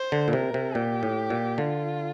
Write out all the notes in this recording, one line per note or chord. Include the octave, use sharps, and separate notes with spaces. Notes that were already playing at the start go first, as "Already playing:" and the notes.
Already playing: C5
D3
A#2
C3 A#4
C3
A#2 G4
A2
A#2
D3 F4